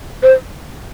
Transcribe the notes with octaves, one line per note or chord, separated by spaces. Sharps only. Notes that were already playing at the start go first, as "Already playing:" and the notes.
C5